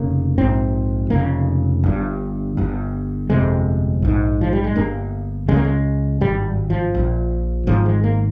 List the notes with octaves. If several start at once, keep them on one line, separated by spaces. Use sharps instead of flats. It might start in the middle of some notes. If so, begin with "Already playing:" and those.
Already playing: F1 C#3 A#3
A#1 G#2 C4
F1 F2 C#3 A#3
G1 G2
G1 G2
G1 F2 C3 G#3
A#1 G#2
F3
G3
G#3
G1 G2 A#3
C#2 C#3 G#3
A#3
G#3
G#1 G2 G3
F3
A#1 A#2
G#1 G#2 F3
G#3
A#3